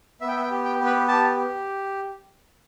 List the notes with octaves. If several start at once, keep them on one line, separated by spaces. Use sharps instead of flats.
B3 E5
G5
E5
G5
G4
G5
B3
B4
G4 A5
G4